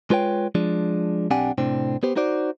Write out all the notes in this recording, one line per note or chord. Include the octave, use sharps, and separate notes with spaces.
G#3 F4 B4 C#5 G5
F3 G#3 D4
B1 C4 D4 G4 F#5 G#5
A2 C3 C4 D4
B3 G4 C5
D#4 F#4 C5 D5